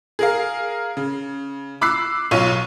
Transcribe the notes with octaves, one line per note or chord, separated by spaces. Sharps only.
G#4 A#4 F5
C#3
B5 D6 E6 F#6 C7
B1 F4 C#5 C#6 D#7